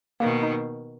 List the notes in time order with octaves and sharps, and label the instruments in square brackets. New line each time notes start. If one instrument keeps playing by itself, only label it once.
[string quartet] B2 D#3 [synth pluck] A#3
[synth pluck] D#4